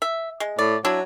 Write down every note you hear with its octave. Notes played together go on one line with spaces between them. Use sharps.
E5
G#3
A2 D5
F#3 D4 E4